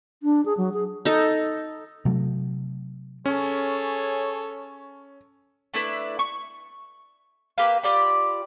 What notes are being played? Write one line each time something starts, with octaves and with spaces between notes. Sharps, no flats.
D4
G#4
F#3
G#4
D#4 A4
C3 F#3 A3
C#4 G#4 A4 C#5
A3 D4 E4 B4
C#6
A#3 G4 B4 F5
F4 G4 D5 B5